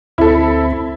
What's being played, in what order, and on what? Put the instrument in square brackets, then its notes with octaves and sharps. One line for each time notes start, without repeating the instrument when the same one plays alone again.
[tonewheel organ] D2 C4 B5 [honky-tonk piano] E4 A4